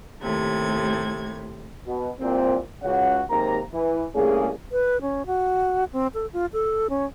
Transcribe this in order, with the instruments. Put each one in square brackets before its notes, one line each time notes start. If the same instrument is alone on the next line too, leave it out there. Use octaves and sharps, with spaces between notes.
[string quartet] D#2 A2 C3 G#6
[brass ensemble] B2
C2 A#2 C4
C#2 C#3 F#4 C#5 F#5
D#2 G#2 C3 A#3 A#5
E3
C2 A3 A#3 C#4 G#4
[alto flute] B4
C#4
F#4
C4
A4
F4
A4
C#4